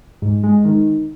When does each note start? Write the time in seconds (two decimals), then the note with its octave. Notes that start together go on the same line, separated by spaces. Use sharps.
0.22 G#2
0.44 G#3
0.65 D#3